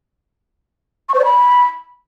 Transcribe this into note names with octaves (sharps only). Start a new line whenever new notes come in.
C#6
C5
D5
B5